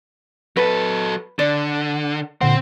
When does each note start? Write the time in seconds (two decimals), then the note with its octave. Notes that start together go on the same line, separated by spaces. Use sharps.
0.57 F#3 A4 B4
1.39 D3 D5
2.41 A#2 D3 C4 C5 F#5